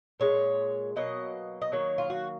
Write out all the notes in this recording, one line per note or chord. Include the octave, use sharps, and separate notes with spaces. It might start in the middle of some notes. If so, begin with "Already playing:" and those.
A#2 G#3 C#5
B2 F#3 A#3 D#5
D#5
D#3 F#3 A#3 C#5
F4
F#4